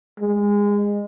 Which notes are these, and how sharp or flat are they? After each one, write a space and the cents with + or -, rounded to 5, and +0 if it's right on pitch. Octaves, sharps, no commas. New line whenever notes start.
G#3 -20